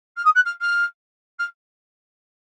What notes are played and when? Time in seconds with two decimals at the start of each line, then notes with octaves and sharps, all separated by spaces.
0.16 F6
0.24 D#6
0.35 F#6
0.45 F6
0.60 F6
1.39 F6